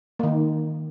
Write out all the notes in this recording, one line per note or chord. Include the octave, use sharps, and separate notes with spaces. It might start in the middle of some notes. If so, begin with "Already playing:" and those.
D#3 A#3 D#4